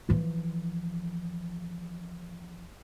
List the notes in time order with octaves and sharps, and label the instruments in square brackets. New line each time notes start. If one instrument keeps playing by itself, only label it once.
[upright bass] E3 F3